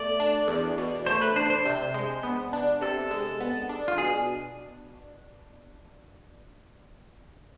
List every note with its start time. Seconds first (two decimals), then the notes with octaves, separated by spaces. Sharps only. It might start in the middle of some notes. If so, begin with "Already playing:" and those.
Already playing: B2 A3 D5
0.20 D4
0.48 E2
0.78 B2
1.06 A3 C5
1.21 B4
1.36 D4 C5
1.50 C5
1.65 C3 C5
1.94 G#3
2.23 B3
2.53 D4
2.82 C3 A4
3.11 G#3
3.41 B3
3.69 D4
3.88 F4
3.98 B2 G#4